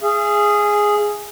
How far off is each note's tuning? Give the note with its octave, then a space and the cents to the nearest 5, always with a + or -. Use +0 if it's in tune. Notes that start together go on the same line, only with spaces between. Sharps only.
G#4 +0 F5 -45